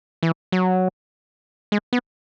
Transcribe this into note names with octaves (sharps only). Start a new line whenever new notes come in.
E3
F#3
G#3
B3